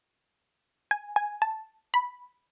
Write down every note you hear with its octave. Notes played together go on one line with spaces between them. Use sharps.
G#5
G#5
A5
B5